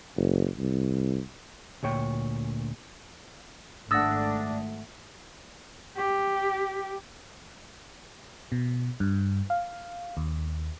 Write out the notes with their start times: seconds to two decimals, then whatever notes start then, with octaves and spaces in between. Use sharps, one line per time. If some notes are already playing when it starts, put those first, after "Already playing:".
0.16 F#1
0.58 C2
1.83 D2 A#2 C#5 G5
3.91 G#1 A3 D4 F#5 D#6 E6 A6 A#6
5.97 G4
8.52 B2
9.00 G2
9.50 F5
10.17 D#2